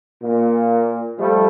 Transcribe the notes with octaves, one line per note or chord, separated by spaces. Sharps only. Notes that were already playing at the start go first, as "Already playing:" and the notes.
A#2
F3 G3 A3 A4